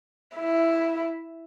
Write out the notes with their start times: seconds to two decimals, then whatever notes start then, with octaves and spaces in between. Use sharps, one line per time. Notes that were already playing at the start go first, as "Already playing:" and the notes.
0.36 E4